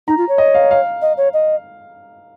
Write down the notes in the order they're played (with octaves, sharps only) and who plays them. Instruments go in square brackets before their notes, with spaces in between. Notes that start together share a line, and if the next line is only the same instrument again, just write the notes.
[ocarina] D#4 [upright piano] A#5
[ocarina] F4
C#5
[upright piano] D#5
F5
F5
[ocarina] D#5
C#5
D#5